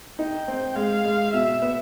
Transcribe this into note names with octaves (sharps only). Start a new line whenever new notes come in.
D#4 G5
C4
G#3 F5
G#3
B2 E5
B3